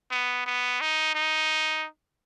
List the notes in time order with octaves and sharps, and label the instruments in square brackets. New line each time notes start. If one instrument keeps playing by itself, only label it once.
[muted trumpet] B3
B3
D#4
D#4